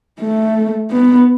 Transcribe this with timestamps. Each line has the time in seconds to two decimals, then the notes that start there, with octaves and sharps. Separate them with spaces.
0.20 A3
0.91 B3